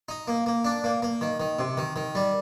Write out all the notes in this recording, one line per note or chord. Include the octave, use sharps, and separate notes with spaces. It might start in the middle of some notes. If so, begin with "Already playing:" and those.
D#4
A#3
A#3
D4
A#3
A#3
D#3
D#3
C3
D#3
D#3
G3